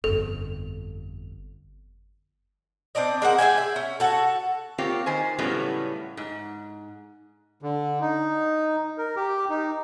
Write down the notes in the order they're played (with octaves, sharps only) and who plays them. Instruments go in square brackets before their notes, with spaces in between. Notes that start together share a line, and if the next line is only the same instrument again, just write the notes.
[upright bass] G1 F2 [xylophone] A4
[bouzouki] C4 D4 D5 D#5
G#3 A#3 F#5
G#4 E5 G5 G#5
E5
C#4
F#4 A4
[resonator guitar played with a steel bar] A#3 C4 F4 G4 C#5
D#3 C5 G#5
A2 C#3 F#3 G3 B3
G#2
[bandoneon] D3
D#4
A#4
G4
D#4